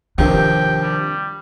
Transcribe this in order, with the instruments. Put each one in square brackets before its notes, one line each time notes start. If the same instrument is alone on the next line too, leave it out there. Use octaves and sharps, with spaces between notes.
[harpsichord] D#2 C3 F3 [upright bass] D4 [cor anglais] G5
[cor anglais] G3